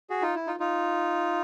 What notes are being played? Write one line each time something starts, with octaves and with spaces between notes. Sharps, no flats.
F#4 G#4
D#4 F4
E4
D#4 F4
D#4 F4